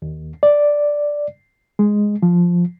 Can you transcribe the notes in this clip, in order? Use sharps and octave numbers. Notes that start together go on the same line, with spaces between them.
D#2
D5
G#3
F3